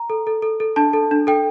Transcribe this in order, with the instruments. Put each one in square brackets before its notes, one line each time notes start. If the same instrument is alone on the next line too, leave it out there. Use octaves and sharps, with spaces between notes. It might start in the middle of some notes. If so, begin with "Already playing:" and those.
Already playing: [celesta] A#5
A4
A4
A4
A4
D4 A5
A4
D4
A4 G5